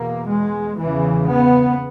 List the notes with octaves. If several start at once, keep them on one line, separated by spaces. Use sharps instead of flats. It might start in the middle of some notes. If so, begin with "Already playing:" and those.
Already playing: E2 B2 A#3
G#3
E2 C#3 E3
B3